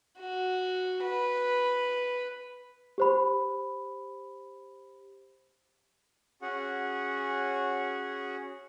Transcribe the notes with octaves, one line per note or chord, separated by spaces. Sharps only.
F#4
B4
G4 C5 B5
C#4 F#4 G#4 F#5